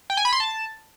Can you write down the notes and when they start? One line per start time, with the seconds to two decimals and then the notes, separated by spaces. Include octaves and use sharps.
0.10 G5
0.17 G#5
0.25 B5
0.33 C6
0.40 A5